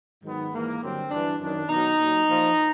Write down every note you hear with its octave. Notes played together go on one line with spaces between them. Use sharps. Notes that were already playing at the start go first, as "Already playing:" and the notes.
G#2 D#3 F#3 B3
G#2 E3 A#3
G2 D3 F#3 C4
G2 E3 D4
F#2 D#3 F#3 D4
B2 F#3 D#4
A#2 F#3
A#2 F3